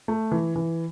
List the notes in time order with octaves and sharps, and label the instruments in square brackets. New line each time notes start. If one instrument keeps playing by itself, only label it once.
[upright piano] A3
E3
E3